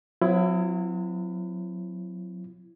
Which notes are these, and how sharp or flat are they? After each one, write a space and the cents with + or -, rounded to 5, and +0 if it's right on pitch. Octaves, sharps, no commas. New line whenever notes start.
F#3 -30 C4 -40 E4 +25